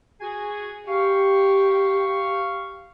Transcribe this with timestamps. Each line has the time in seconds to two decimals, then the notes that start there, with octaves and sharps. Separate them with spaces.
0.21 F#4 G#4 G#5
0.88 G4 F5 C#6